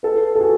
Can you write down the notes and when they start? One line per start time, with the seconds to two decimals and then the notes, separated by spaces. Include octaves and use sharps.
0.03 A4 B4
0.35 A4
0.40 F#4 G#4